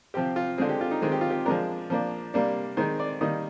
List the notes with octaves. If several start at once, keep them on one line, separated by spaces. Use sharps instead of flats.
C3 F3 C4 G4
F4
D3 G#3 C4 G#4
G4
F4
D#4
D#3 G#3 C4 G#4
G4
F4
G4
F3 G#3 D4 A#4
F3 A#3 D4
C3 G3 A#3 D4
D#3 G#3 C4 C5
D5
D#3 G3 A#3 D#5